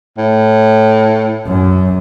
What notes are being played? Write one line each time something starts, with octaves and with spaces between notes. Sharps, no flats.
A2
F#2